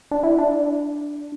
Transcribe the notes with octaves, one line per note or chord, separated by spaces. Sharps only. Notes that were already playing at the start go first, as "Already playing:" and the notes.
D4
E4
D4